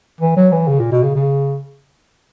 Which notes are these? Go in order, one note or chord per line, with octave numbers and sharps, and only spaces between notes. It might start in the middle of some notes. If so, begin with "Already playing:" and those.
E3
F#3
E3
C#3
A#2
B2
C#3
C#3